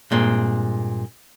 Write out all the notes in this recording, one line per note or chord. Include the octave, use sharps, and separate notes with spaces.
G2 A#2 G#3 C4